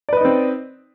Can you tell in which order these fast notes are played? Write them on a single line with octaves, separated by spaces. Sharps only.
D5 B4 D#5 D#4 C4